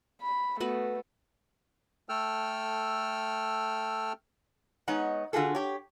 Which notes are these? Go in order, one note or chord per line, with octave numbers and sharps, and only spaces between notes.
B5
A3 B3 F#4 B4
A3 A4 G5 E6 F6
G#3 B3 D#4 C#5 F#5
D3 F4 F#4 G#4 A4
G4 C#5